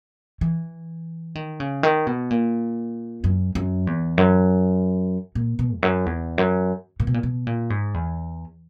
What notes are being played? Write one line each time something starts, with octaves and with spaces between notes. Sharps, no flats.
E3
D#3
C#3
D#3
B2
A#2
F#2
F#2
E2
F#2
A#2
B2
E2
F#2
E2
F#2
A#2
B2
A#2
B2
A#2
G#2
E2